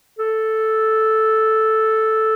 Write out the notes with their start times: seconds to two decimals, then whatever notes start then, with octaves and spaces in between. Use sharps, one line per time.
0.19 A4